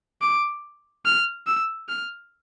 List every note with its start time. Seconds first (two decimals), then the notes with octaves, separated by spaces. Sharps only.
0.21 D6
1.05 F6
1.47 E6
1.89 F6